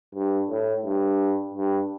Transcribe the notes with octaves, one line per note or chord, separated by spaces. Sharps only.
G2
A2
G2
G2